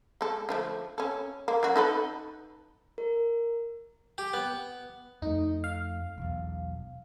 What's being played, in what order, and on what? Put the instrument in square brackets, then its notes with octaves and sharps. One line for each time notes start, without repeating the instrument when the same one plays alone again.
[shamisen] G#3 A4
D3 F3 A3
C#4 A4
A#3
F#3 C#4 F#4
D#4 A4 B4
[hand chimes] A#4
[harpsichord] G4
B3
[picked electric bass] F2 A3 [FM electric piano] D#4
[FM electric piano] F5
[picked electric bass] E1 B1